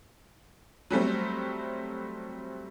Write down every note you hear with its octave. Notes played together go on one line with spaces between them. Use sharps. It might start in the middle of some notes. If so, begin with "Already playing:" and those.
F#3 G3 A3 C4